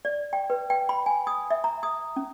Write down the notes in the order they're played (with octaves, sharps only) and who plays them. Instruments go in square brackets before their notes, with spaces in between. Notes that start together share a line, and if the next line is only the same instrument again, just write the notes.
[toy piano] D5
G5
B4
G5
B5
G#5
D#6
E5
A#5
D#6
C#4